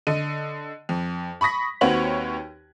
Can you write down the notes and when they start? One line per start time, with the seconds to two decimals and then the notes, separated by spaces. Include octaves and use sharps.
0.07 D3 D#5 D#7
0.89 F2
1.41 B5 C#6 D#6 A#6 B6
1.81 D#2 C4 F#4 B4 C#5 F#7